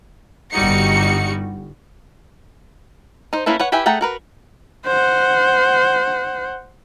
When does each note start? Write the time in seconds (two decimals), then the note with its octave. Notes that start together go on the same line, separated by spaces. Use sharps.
0.53 G1 G3 D#4 F#4 C#7
3.33 D#4 C5
3.46 A#3 C#4 E4 A4 B4
3.60 B4 C#5 F#5
3.72 E4 G4 B4 E5 G#5
3.86 A3 G#4 F#5 G5 A#5
4.01 F#4 A#4 B4
4.87 C5 F#5